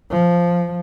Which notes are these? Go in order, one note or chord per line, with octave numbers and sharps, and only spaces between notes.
F3